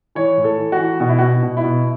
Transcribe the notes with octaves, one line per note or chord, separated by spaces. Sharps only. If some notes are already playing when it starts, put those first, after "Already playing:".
E3 C#5
A2
A4
E3
F#4
E3
B2 F#4
E4
B2 F#4
B2
E4
B2